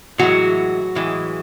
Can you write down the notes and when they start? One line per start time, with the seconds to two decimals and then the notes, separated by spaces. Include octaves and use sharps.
0.18 A2 E3 F#3 G#3 F#4
0.95 A2 E3 G#3